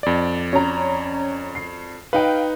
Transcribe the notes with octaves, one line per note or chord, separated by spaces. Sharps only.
F2 D5
C#4 A#5
C7
D#4 B4 F5 G5